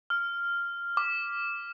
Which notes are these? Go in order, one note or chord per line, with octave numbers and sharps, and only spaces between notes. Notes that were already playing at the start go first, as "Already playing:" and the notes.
F6
D6